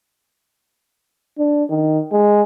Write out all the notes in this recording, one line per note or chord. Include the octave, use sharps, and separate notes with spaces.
D4
D#3
G#3